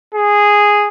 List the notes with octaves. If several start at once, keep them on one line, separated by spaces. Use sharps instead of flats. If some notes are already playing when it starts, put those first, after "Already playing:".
G#4